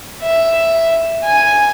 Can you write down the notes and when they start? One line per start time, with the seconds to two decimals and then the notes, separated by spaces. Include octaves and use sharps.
0.23 E5
1.24 G#5